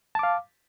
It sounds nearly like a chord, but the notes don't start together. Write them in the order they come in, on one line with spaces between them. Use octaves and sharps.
A5 D6 F5